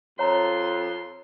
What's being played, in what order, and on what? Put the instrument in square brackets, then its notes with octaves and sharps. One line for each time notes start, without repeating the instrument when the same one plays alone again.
[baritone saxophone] F2 [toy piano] C#5 A#5 [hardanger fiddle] C6